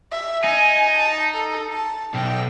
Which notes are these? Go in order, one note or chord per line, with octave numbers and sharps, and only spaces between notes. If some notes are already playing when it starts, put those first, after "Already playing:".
E5
D#4 G#5
A5
A4
A5
B1 G5